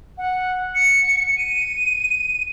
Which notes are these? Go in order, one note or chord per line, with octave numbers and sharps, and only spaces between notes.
F#5
C#7
D#7